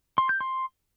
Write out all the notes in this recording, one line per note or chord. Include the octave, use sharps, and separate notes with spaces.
C6
G6
C6